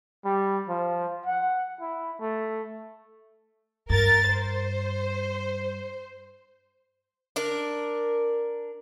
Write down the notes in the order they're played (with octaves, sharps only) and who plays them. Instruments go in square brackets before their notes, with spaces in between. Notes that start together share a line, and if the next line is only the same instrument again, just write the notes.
[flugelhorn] G3
F3
F#5
E4
A3
[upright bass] G2 [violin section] A#4 A6
[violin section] C5
[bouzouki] D4 A#4